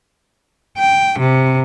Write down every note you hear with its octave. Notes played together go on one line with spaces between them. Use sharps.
G5
C3